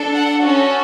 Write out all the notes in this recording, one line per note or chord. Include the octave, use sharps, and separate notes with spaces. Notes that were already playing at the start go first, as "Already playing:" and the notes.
Already playing: D4 A4
F#5
C#4 F#4 A4